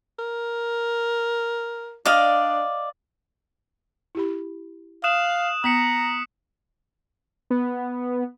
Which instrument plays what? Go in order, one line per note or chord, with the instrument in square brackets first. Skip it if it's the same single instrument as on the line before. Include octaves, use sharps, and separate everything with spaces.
[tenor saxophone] A#4
[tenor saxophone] D4 [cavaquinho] D5 D#5 F5
[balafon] E4 G4 B5
[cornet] F5 [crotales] D#6 F#6 E7
[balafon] B3 [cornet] A#5 [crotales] D#6 B6 C#7
[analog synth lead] B3